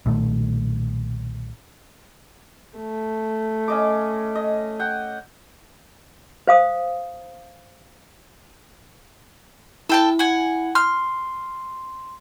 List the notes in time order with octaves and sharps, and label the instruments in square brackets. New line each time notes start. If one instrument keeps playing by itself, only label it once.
[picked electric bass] B1 A#2 D#3 A3
[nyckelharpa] A3
[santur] C#4 D#5 D6
D#5
F#5 G5
[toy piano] C5 F5 D#6
[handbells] E4 [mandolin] A4 G5 A5
[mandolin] F#5 G#5
[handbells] C6 [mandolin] F6